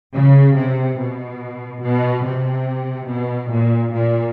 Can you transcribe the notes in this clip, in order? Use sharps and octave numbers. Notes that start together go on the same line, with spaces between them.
C#3
C3
B2
B2
C3
B2
A#2
A#2